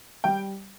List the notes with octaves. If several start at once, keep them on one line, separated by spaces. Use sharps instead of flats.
G3 G5